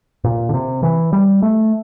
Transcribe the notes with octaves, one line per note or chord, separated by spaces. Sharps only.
A#2
D3
C3
E3
G3
A3